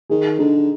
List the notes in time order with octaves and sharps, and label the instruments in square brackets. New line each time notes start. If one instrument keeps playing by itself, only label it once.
[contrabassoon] D#3 [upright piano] G#4
[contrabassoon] D3 [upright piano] D#4